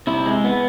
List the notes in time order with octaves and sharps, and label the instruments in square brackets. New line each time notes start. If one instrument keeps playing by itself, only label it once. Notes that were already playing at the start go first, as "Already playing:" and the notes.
[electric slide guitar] C3 E4
G#3
B3